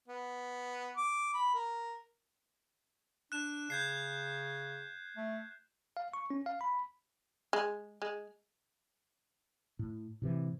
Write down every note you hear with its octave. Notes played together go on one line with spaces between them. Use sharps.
B3
D6
B5
A#4
D4 F#6 E7
C#3 G6 G#6 C7
A3
F5
C#6
C#4
F5
B5
G#3
G#3
A2
A2 C3 E3